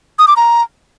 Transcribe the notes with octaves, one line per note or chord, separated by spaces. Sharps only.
D#6
D6
A#5